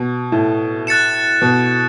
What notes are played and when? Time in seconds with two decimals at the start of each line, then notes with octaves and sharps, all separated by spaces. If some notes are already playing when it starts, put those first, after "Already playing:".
Already playing: B2
0.32 A2
0.87 F#6 A6 C#7 E7
1.42 B2